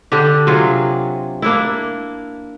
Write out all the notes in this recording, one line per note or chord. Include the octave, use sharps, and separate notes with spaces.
D3 D4 G4
C3 F#3 F4 G#4
A#3 D4 E4